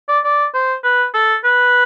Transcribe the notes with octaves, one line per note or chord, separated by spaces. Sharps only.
D5
D5
C5
B4
A4
B4